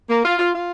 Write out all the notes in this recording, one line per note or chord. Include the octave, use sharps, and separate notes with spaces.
A#3
F4
F4
F4